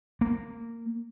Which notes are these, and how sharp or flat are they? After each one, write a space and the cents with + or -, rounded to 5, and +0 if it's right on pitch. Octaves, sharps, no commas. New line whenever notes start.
A#3 -15